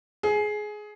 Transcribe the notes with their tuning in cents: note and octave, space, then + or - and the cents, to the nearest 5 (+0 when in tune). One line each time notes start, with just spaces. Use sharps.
G#4 +15